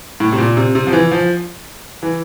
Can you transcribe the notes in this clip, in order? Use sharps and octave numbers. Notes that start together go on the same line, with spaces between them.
A2
C3
A#2
C3
C3
F3
E3
F3
E3